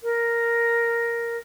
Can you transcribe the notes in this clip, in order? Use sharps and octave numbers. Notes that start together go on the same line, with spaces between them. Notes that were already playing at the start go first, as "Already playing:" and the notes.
A#4